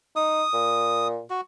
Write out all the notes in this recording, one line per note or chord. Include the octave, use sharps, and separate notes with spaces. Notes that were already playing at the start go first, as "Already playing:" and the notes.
D#4 D#6
A#2
F#4